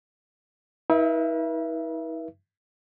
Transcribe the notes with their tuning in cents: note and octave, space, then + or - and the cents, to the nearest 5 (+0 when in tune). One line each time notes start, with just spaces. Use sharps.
E4 -45 B4 -40 E5 +25